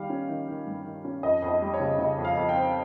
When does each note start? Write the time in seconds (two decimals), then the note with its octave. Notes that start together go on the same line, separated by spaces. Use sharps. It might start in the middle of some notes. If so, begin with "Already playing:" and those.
Already playing: D#3 G3 F5
0.10 C#4
0.29 D#3
0.48 D#3
0.67 G2
0.85 D#3
1.05 C#4
1.23 F2 D#5
1.42 F2
1.48 D#5
1.62 G3
1.74 C#5
1.80 C#3
1.99 C#3 D#5
2.18 F2
2.25 F5
2.37 F2
2.49 G5
2.56 C4